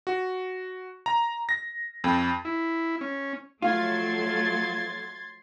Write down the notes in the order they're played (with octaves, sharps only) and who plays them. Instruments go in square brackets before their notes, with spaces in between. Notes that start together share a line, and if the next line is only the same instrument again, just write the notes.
[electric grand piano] F#4
A#5
A#6
F2
[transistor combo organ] E4
C#4
[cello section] F3 F#3 A3 [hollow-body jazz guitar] F4 [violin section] C6 G#6 A6